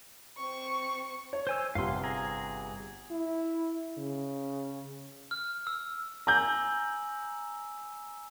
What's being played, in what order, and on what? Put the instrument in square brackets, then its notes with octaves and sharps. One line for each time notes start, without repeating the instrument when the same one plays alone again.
[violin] C4 C#6
[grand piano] C#5
[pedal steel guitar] C5 G#5 E6
[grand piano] G1 C3 [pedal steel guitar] F5 C6
[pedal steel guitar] G#4 A#5
[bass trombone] E4
C#3
[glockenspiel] F6
E6
[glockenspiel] G#5 E6 F#7 [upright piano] A#5 G6